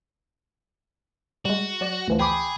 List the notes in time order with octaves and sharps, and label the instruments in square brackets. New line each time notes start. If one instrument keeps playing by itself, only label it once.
[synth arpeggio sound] G3 G#3 [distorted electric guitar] F#4
[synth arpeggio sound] F#3 D5
D2 E3 F3
[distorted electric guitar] G#4 [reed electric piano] G5 B5 D6